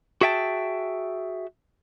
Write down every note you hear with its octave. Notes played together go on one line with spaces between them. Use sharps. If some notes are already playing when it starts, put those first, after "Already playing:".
F#4 G#4 E5 G5 A5